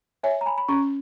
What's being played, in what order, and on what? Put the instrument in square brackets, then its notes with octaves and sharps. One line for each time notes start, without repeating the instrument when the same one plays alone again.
[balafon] C#5 [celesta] E5 G#5
[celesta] A#5
G#5 B5
B5
[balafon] C#4 [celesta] A#5 C#6